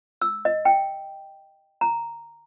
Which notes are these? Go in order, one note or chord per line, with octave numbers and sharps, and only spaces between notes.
E6
D#5
G5
A#5